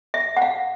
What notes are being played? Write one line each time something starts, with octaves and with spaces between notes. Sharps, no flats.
E5
F#5
F5